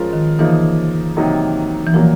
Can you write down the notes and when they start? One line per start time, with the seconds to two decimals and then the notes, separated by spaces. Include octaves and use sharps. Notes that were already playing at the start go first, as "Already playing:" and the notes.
Already playing: F3 G#3 C#4 F4 A#4
0.13 D#3
0.39 C#3 E3 F3 A#3 D#4
1.17 C3 D#3 F#3 A#3 D#4
1.87 E3
1.94 A#2 F3 F#3 A#3